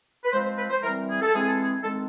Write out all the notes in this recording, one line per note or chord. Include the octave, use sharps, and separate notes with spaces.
B4
F3 G#3 C4 C5
C5
B4
C5
E3 G3 C4 A#4
G#4
A4
E3 G#3 C4 G#4
A4
G#4
D#3 G#3 C4 A4